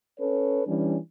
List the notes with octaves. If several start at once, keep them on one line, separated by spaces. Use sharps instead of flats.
C#4 A4 B4 C#5
E3 G3 C#4 D4